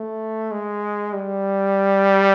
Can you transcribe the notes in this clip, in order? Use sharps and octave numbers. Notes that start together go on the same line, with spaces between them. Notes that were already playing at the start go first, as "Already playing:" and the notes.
Already playing: A3
G#3
G3